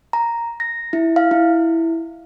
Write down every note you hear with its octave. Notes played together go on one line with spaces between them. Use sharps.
A#5
A#6
E4
F5
E4